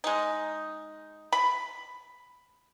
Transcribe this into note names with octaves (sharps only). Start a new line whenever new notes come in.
G#3 D#4
B5